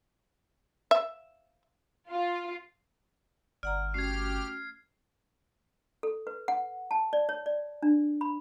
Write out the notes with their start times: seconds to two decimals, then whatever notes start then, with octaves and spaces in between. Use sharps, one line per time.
0.91 E5
2.09 F4
3.63 G1 D5 F#5 A#5 F6
3.94 A3 C#4 F#4 G4 F6 G#6 C7
6.03 A4
6.27 B4
6.48 F#5
6.91 A5
7.13 D5
7.29 C#5
7.46 D5
7.83 D4
8.21 B5